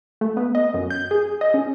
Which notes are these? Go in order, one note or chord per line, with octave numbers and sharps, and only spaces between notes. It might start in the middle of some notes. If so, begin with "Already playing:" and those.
A3
B3
D#5
F#2
G6
G#4
D#5
C#4